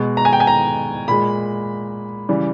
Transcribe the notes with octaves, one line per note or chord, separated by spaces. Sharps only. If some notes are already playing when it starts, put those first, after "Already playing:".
Already playing: B2 G#3
A#5
G#5
G5
G#5
A#5
A#2 G#3 B5
C#3 E3 G3